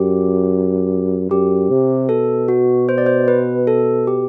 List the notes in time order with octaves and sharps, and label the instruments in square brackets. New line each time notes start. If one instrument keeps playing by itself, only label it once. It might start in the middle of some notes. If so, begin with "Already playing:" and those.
Already playing: [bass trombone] F#2 [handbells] G4
[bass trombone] F#2 [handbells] G4
[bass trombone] C3
[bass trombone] B2 [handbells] A4
[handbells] F#4
C5
D5
C5
B4
A4
G4